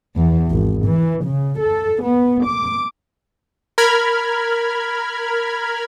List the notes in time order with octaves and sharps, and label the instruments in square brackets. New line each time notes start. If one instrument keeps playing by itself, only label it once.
[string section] E2
G#1
E3
C#3
A4
B3
D6
[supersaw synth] A#4 B5 F6 G#6